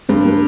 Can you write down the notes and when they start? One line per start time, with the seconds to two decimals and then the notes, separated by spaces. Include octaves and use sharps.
0.09 G2 G#3 C4
0.25 G3 A#3